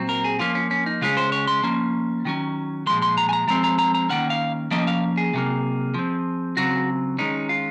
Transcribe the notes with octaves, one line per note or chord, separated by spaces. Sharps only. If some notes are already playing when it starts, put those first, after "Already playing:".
Already playing: A#2 F#3 C4
A#4
G#4
F3 A#3 C#4 F4
C#4
C#4
D#4
C#3 G#3 C#4 F4
C5
C#5
C6
F3 A#3 C#4
D#3 F#3 C#4
A#2 F3 G#3 C6
C6
A#5
G#5
A#5
F3 G#3 C4 A#5
A#5
A#5
A#5
D#3 A#3 C#4 F#5
F5
F3 A#3 C#4 D#5
F5
G#4
C3 F#3 A#3
F3 C4
C#3 F#3 C4 F#4
D#3 G#3 C#4 D#4
F4